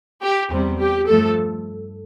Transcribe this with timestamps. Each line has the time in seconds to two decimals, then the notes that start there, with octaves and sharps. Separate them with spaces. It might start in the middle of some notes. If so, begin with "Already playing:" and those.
0.22 G4
0.50 E2 C3 G3
0.79 G4
1.08 G2 F3 A3 A4